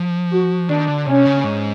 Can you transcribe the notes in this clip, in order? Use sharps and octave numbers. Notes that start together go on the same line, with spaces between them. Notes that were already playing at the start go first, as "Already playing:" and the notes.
Already playing: F3
F#4
D#3 D4
D3
C3 C#4
C#3
G#2